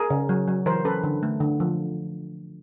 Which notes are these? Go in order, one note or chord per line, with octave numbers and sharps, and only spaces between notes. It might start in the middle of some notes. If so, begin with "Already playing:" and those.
Already playing: G#4 A#4
C#3
F#3
F#3
E3 A#4 C5
C#4 A4 B4
D3
A3
D3
F3